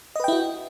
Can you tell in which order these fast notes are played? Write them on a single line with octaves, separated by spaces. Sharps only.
D#5 B4 G5 E4 F#4